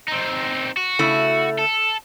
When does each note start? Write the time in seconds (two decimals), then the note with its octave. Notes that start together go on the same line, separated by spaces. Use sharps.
0.08 C4 D#4
0.77 F#4
0.99 C#3 A3 E4
1.59 A4